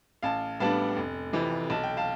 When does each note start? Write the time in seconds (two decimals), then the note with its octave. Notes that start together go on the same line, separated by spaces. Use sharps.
0.23 A1 F5 A5
0.60 A2 G3 B3 D4 F5 A5
0.96 F1
1.33 F2 C3 E3
1.70 B1 A5
1.83 G5
1.97 F5 A5